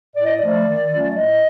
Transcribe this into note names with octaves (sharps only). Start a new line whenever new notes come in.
A2 D5
D#5
F3 A3 D5
D#3
F#3 A3 C#4 F4
A2 D#5